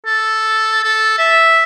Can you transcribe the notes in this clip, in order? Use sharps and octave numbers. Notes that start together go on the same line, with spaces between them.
A4
A4
E5